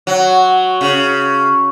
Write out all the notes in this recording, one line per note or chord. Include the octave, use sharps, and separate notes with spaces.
F#3
C#3